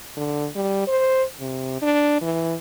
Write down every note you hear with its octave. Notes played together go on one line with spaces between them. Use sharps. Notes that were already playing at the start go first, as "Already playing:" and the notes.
D3
G3
C5
C3
D4
E3